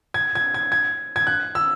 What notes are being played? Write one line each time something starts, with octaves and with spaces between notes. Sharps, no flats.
G#6
G#6
G#6
G#6
G#6
F#6
E6